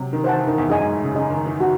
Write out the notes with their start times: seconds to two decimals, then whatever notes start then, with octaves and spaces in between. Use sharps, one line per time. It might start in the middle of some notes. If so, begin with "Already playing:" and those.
Already playing: C3 F#3
0.13 D#3
0.24 E3 C5 F#5 A5
0.36 E3
0.47 D#3
0.58 E2
0.69 F#2 G#4 D#5 G#5
0.81 G#2
0.93 A2
1.04 C#3
1.15 C#3 G#4 D#5 G#5
1.30 D#3
1.46 E3
1.60 F#4